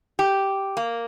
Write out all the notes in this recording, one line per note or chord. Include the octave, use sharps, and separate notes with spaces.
G4
A#3